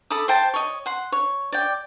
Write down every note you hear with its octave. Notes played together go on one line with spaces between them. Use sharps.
A4 B5 D6 D#6
C5 G5 A5
C#5 D#5
F#5 C6
C#5
D5 G5